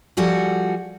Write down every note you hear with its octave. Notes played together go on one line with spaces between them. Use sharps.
F3 G3 F#4 G#4 A4